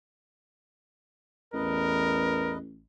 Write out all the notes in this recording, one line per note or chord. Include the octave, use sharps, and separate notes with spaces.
A1 E2 A#4 B4 D#5